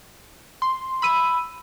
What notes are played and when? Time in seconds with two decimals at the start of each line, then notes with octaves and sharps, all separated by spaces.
0.62 C6
1.02 B5 E6 D#7